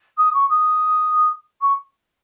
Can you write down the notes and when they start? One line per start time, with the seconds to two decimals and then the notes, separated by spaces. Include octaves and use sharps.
0.17 D#6
0.33 C#6
0.49 D#6
1.61 C#6